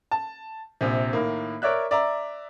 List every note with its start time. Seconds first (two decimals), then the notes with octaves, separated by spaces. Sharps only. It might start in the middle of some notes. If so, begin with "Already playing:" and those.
0.11 A5
0.81 A#1 C3
1.13 A2 D#3 A#3
1.62 A#4 C#5 D5 E5 F#6
1.91 D5 E5 A#5